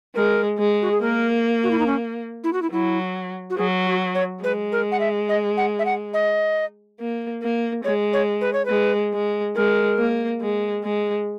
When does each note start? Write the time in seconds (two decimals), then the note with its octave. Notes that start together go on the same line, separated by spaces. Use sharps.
0.15 G#3 A#4
0.59 G#3
0.82 F#4
0.91 G#4
1.01 A#3 A#4
1.63 F#4
1.71 E4
1.79 D#4
1.86 C#4
2.44 E4
2.53 F#4
2.62 E4
2.72 F#3 E4
3.50 F#4
3.58 F#3 G#4
3.86 F#4
4.15 C#5
4.43 G#3 B4
4.72 A#4
4.92 F#5
5.00 E5
5.29 D#5
5.57 F#5
5.79 E5
5.85 F#5
6.14 D#5
7.00 A#3
7.43 A#3
7.84 G#3 C#5
8.13 C#5
8.41 B4
8.53 C#5
8.65 G#3 B4
9.13 G#3
9.55 G#3 A#4
9.98 A#3
10.41 G#3
10.84 G#3